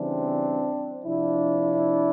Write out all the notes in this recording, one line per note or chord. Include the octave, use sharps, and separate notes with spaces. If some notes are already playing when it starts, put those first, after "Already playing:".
Already playing: C#3 E3 G3 C4 D4
C3 F3 D4 E4